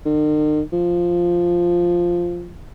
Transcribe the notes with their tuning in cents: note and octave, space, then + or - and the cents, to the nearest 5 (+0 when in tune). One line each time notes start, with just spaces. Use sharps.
D#3 -45
F3 +0